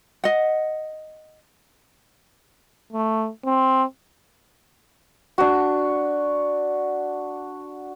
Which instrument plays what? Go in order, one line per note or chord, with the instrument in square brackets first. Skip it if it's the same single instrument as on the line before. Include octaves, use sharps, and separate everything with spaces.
[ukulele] D#5 F#5
[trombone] A3
C4
[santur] D4 F#4